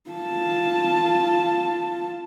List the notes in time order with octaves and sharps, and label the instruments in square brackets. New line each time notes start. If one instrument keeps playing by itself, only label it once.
[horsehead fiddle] F4 A5